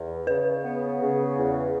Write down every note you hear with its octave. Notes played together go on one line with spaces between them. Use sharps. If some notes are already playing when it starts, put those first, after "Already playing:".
Already playing: E2
C#3 B4
B3
C#3
E2